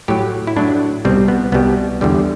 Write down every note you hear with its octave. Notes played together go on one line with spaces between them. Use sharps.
A2 F#3 G4
E4
A2 F#3 D4
C2 B2 G3 C4
B3
C2 B2 G3 B3
E2 D3 G3